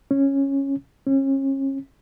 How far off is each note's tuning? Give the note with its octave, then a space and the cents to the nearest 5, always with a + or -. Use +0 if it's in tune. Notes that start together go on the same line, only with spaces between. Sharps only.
C#4 -10
C#4 -35